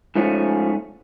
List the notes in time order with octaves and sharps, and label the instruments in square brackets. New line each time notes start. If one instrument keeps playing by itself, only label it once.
[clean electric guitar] G#2 F3 A3 C#4